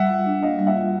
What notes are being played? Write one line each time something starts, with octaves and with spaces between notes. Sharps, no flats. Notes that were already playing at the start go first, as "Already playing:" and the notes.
Already playing: G3 E5 F#5
F4
D4
A#3 D#5 F5
G3
E5 F#5
F4